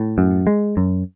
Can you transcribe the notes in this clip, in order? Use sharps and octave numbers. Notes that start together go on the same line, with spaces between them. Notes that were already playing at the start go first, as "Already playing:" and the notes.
Already playing: A2
F#2
G#3
F#2